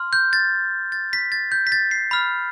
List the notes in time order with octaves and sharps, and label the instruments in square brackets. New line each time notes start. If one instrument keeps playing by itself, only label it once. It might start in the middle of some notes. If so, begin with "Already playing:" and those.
Already playing: [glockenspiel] C6 F6
G6
A6
A6
B6
A6
G6
B6
A6
C7
B5 F6